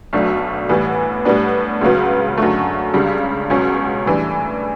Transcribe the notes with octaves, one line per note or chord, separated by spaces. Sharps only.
B1 B2 F#3 A3 D4
A2 E3 G3 B3
A2 G3 B3 D4
C#2 C#3 F#3 B3
F#2 D3 F#3 A3
C#2 C#3 G3 D4
C#2 B2 F#3 C#4
A2 E3 G3 D4